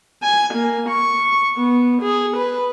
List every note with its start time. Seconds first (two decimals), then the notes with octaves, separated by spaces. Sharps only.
0.22 G#5
0.54 A#3
0.89 C#6
1.57 B3
2.02 G#4
2.37 B4